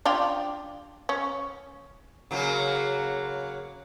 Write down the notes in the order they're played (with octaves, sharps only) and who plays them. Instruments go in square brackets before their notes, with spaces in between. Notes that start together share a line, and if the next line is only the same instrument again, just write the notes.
[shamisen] D4 F4 G4
C#4
[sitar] C#3 F#3 A#3